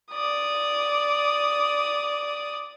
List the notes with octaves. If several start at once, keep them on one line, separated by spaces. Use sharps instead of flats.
D5 D#6